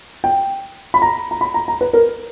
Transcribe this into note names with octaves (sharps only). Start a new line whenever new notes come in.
G5
B5
A#5
A#5
B5
A#5
A#5
B4
A#4